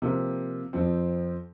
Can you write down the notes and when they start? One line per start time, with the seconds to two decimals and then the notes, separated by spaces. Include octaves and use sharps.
0.02 C3 F3 A#3 F4
0.73 F2 F3 C4